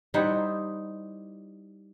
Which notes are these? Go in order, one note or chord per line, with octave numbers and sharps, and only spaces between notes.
G3 D#4 E4 C5 E5 F#5